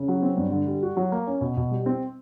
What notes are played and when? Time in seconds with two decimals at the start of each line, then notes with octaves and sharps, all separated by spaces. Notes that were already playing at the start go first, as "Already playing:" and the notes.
Already playing: C#3
0.08 F#3
0.22 C4
0.37 G2
0.52 D3
0.67 G3
0.83 F#4
0.97 F#3
1.12 A#3
1.27 C#4
1.41 B2
1.57 B2
1.71 G3
1.86 C4